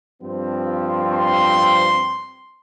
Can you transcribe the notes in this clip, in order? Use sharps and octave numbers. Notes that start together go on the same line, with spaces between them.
G2 F3 C4
C6